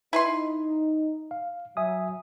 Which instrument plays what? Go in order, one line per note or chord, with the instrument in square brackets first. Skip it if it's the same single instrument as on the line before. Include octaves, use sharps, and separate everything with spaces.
[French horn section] D#4 [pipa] E4 B4 C6
[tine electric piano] F5
[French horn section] F#3 [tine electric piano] E5 G#5 D#6